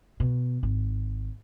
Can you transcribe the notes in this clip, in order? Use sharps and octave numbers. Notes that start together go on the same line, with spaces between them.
B2
G#1